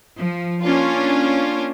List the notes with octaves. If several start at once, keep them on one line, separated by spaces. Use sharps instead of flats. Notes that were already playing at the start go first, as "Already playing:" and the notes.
F3
A#3 C#4 D4 F4